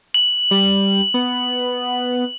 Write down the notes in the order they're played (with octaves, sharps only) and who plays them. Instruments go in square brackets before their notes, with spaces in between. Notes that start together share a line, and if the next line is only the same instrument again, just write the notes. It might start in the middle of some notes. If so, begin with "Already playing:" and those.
[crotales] F#7
[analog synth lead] G3
B3